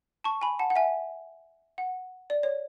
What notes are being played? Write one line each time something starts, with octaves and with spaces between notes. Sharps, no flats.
A5 C#6
G#5 B5
F#5 A5
F#5
E5 G#5
F#5
D5
C#5